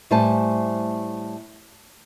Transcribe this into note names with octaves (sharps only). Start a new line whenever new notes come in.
A2 G3 A3 C5 G#5 A5